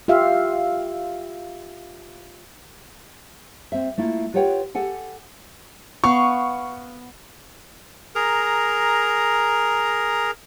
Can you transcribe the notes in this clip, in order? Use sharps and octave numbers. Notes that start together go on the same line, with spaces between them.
F4 G4 E5 F5
C4 E5
A3 A#3 E4 F4
F4 G4 B4 C#5 F#5 G5
G4 A4 F#5 G#5
B3 F5 C#6
G#4 A#4 A#5